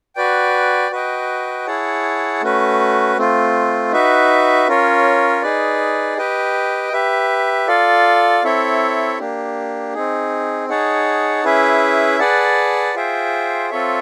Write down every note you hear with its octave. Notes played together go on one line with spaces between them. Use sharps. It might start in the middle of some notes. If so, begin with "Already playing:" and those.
F#4 B4 D5 G5
F#4 B4 D#5 G5
E4 G#4 C#5 F#5 A5
A3 C#4 F#4 B4
A3 C4 F4
D#4 F#4 B4 E5
C#4 F4 A#4 C#5
D#4 G#4 B4 D5
G4 B4 D#5 G5
G4 B4 E5
F4 A4 D5 F5
C4 E4 A4 C#5 E5
A#3 D4 G4
C4 D#4 G#4
D#4 G#4 C#5 F#5 A5
C#4 E4 G#4 B4 E5
G#4 B4 D5 F#5 A5
F4 G#4 C5 E5 G5
C4 F4 A4 C#5 E5